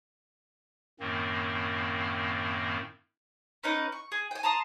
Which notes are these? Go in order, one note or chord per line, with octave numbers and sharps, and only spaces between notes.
F#2 A2 D#3 A#3 C4
C#4 D#4 B4
C#6
G#4
G5 G#5
A5 A#5 C6 D#6